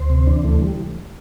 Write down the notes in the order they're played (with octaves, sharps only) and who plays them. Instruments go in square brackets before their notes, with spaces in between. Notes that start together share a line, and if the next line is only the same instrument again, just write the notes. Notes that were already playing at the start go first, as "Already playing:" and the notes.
Already playing: [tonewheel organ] D2 C5
C3
E3 D4
D2 A3
G3